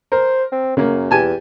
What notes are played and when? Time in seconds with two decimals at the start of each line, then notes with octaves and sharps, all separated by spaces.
0.12 A#4 C5
0.52 C4
0.77 F#2 C#3 A#3
1.11 E2 G4 G#5 A5